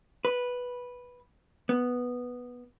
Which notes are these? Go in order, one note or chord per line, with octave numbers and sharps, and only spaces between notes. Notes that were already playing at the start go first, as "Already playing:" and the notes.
B4
B3